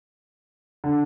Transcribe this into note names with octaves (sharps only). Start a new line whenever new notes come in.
D3